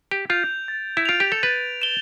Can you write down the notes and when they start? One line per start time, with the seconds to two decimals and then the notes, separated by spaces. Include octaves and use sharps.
0.11 G4
0.30 F4 G6 D7 F7
0.68 A6
0.97 E4
1.06 F4 D7 F7
1.20 G4
1.32 A4
1.43 B4 A6
1.82 E7 G7